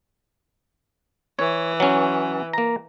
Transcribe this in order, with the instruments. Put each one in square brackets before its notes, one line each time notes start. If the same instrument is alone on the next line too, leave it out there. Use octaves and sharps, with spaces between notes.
[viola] E3 [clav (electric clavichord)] C#5
[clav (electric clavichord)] F#3 C#4
A#3 A#5